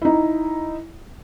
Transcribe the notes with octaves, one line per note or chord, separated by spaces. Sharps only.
D#4 E4